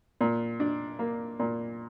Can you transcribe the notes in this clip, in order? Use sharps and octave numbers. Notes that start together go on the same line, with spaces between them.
A#2
D4
A#3
A#2